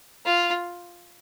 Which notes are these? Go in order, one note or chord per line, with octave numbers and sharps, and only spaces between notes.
F4